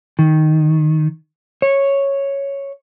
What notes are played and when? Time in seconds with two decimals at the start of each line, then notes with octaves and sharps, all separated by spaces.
0.19 D#3
1.62 C#5